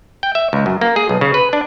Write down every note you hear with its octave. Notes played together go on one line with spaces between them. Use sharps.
G5
E5
C#2
F#2
A#3
G#4
B1
C#3
B4
D4